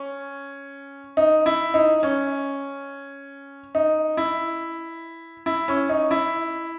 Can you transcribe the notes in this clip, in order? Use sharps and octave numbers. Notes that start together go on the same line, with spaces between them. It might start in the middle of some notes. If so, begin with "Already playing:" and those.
Already playing: C#4
D#4
E4
D#4
C#4
D#4
E4
E4
C#4
D#4
E4